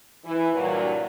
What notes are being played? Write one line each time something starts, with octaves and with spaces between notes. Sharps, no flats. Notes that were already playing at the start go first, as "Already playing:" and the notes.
E3 E4
G2 A#2 F#3